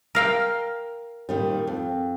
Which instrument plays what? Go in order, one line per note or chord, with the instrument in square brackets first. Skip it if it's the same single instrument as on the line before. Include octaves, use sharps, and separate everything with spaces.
[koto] A#4 F5 G5
[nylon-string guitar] A#2 D#3 G3
F2